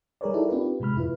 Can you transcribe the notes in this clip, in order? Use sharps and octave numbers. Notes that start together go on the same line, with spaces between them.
G3 G#4 A#4 B4 C#5 D5
D#4 E4 G4 A4 A#4 D5
C4 D4 D#4 F4 G4 B4
A2 C3 G#3 B5 F6
F2 E4 F4 B4